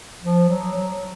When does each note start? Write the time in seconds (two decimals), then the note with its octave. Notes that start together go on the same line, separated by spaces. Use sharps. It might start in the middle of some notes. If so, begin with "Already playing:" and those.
0.24 F3
0.49 F#3
0.74 F#3